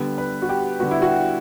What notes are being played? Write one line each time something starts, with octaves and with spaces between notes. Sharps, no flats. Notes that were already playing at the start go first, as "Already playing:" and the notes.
Already playing: D3 G3 B3
B4
F#4
G4
D3 G3 B3 F#4
E4
F#4